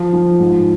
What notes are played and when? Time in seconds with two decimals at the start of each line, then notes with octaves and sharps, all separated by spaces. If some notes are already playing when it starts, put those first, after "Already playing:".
Already playing: F3
0.13 F3
0.40 G#2